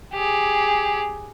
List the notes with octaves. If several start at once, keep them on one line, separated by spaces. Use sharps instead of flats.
G4 G#4